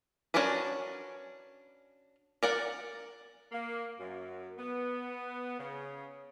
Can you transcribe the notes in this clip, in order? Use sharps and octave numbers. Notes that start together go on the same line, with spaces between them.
C#4 D4 F#4 A#4 B4
A#4 D5 F#5
A#3
F#2
B3
C#3